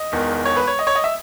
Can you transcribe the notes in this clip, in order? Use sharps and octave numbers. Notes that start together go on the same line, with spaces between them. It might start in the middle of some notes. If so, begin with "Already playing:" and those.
Already playing: D#5
E1 E2 D#3
C#5
B4
C#5
D#5
C#5
D#5
E5